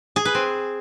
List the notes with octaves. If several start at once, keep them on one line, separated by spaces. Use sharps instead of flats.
G#4
B4
C4